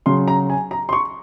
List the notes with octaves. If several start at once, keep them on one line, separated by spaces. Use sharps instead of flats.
C#3 F#3 C6
A#5
G#5
A#5
C6
C#6